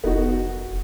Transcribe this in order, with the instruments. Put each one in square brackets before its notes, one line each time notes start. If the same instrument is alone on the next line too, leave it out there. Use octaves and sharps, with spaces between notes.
[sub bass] F1 [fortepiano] B3 D#4 F#4